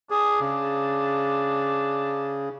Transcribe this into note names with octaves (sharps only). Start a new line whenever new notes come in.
D4 G#4
C#3